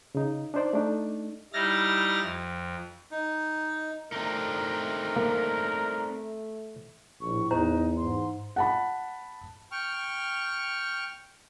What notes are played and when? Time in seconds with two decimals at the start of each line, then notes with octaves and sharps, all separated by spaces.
0.15 C#3 D#4
0.54 D4 D#4 C5 D5
0.73 A3 D4 D#4
1.53 G3 D#4 E4 F6 A6 A#6
2.21 F2
3.11 D#4
4.12 A3 C4 D4 D#4 A#4
5.16 A#3
7.20 A#1 A2 C#6
7.51 E2 D#4 C5 A#5
7.97 G#2 C6
8.56 F#5 A5 B5
9.71 G5 C#6 F6